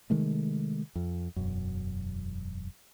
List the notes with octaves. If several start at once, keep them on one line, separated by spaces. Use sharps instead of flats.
C3 D#3 G#3 A3
F2
E1 F#2